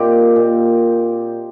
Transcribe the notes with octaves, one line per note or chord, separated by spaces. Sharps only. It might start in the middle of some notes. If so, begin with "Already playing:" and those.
Already playing: A#2 C4 D#4 G4
A#2